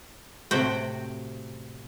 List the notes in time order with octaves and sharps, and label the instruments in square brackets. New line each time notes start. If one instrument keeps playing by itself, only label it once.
[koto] A2 C3 F#4 G5